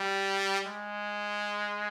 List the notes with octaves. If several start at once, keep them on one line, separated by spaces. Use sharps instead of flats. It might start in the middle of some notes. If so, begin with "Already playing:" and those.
Already playing: G3
G#3